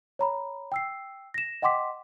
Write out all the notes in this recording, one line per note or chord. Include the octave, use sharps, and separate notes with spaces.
C#5 A#5 B5
G5 E6 C7
A#6 E7
D#5 F#5 G5 C6 D6 B6